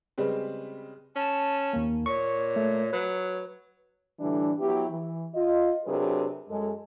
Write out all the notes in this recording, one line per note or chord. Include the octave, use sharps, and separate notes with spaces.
C#3 G3 G#3 C4 B4
C#4 A5
D#2 A#3
A#2 C#5 C#6
A3
F#3 B4
A2 D3 E3 G3 D4
F#3 B3 E4 G4
E3
F4 D#5
C3 F#3 D4 G#4 A#4 B4
F#2 G#3 A4